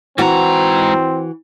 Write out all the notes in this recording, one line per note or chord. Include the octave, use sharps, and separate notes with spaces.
G#2 E3 C4 F#4 A#5